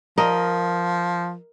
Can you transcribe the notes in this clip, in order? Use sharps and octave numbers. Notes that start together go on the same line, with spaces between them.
F3 A#4 D#5